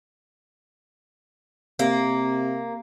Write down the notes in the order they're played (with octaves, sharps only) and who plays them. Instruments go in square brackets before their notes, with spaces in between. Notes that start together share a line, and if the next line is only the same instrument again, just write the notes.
[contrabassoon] C3 [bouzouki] A#3